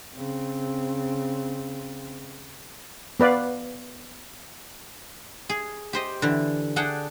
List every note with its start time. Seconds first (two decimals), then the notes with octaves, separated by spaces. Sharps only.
0.15 C#3 C4
3.20 B3 B4 D5 F5
5.49 G#4
5.93 G4 C5 D#5
6.22 D3 E3
6.76 D4 G#4 F#5 G5 A5